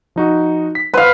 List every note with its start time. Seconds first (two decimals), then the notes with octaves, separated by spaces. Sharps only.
0.16 F3 D#4 F#4
0.75 B6
0.94 B4 C5 F5 F#5 C6